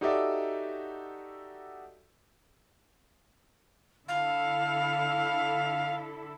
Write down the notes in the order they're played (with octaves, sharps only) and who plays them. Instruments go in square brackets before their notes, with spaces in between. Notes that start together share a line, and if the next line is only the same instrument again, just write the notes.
[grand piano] D#4 F#4 G4 A4 D5 E5
[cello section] D3 E4 A4 [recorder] F5